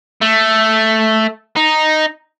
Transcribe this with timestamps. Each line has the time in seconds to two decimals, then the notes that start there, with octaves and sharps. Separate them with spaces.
0.22 A3
1.56 D#4